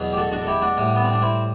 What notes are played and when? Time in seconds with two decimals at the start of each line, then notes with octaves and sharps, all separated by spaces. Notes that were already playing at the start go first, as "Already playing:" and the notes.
Already playing: E2 B2 F#3
0.13 G4
0.17 F#4 A4
0.32 D4 F#4
0.42 A4
0.47 E4 G4
0.62 D4 F#4
0.77 A2 G3
0.95 B3
1.04 C4
1.13 D4
1.22 C4 E4